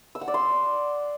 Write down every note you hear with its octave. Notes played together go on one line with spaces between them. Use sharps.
E6
F#5
D5
C6